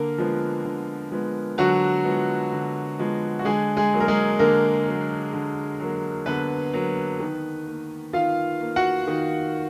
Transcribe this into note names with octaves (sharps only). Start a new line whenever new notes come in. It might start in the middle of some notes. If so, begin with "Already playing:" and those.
Already playing: D3 A#3 A#4
F3 G#3 B3
D3
F3 G#3 B3
D3 F#3 F#4
F3 G#3 B3
D3
F3 G#3 B3
F#4
D3 G#3 G#4
G#3 G#4
F#3 A#3
A#4
G#3 G#4
D3 A#3 A#4
F#3 A#3
D3
F#3 A#3
D3 B3 B4
F#3 A#3
D#3
A#3
D#3 F4 F5
A#3
F#4 F#5
D#3